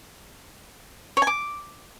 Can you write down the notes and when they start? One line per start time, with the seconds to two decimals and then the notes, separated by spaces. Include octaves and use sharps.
1.17 C#5
1.22 G#5
1.27 D6